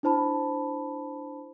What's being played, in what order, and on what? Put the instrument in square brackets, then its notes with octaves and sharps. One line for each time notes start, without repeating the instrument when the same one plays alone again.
[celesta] D4 E4 C5 A5 B5